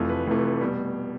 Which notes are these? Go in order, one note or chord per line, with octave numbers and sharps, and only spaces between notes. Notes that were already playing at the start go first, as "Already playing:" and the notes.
Already playing: F1 F2 C3 E3 A3
B4
F1 F2 C3 E3 A3
B2 G3